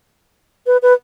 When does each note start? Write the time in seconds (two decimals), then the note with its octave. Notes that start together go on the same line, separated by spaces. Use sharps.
0.67 B4
0.82 B4